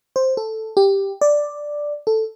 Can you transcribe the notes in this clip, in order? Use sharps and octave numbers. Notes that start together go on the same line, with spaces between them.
C5
A4
G4
D5
A4